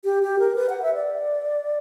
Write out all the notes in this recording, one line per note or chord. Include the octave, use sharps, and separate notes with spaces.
G4
G4
A#4
B4
F#5
E5
D5